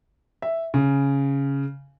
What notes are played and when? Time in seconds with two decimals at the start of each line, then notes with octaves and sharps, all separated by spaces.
0.42 E5
0.74 C#3